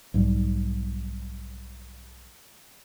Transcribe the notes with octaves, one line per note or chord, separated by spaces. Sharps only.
B1 G#2 G3